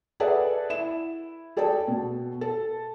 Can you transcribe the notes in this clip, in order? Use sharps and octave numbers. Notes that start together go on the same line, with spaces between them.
G#4 A4 B4 D5 E5 F#5
E4 E7
G#4 A4 D5 G5 A5
B2
A4